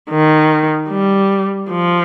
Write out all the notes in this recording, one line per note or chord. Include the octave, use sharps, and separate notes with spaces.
D#3
G3
F3